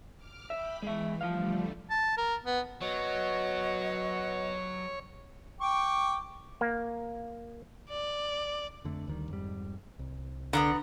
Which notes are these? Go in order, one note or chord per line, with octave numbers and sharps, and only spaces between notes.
D6 F6
E5 G5 B5 B6
E3 G#3 E5
D3 F3 G3 A3 F5
A5
A#4
B3
F#3 B3 F#4 C#5 D#5
G5 C#6 D6
A#3
D5
F2 D3 A3
D2 D#3 G3
F2 G#2 G3
C2
D3 B3 F#5 A#5